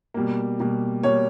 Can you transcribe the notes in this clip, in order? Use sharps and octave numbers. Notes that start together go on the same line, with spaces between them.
B2 G3 A#3
B2 G3 A#3
B2 G3 A#3 C#5